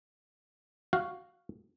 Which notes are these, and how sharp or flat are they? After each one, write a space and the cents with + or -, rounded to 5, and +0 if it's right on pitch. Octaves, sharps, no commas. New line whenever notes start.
F#4 +0 F5 +0